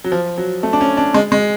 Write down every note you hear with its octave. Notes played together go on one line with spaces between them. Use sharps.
F#3
F3
F#3
A3
D4
C#4
D4
G#3
G#3